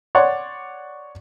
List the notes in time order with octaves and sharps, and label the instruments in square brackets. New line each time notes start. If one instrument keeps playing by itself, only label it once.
[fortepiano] C#5 D5 F#5 C6